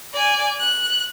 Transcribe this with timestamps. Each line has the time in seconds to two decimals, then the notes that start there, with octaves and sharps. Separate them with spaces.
0.14 D5 G#5
0.60 F#6